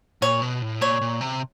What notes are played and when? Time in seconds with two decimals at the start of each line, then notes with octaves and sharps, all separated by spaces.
0.22 A#2 C#5
0.42 B2
0.62 A2
0.81 A#2 C#5
1.01 A#2
1.21 C3